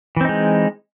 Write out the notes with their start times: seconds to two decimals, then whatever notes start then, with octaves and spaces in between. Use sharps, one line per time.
0.17 E3
0.21 C4
0.25 D#4
0.29 G#3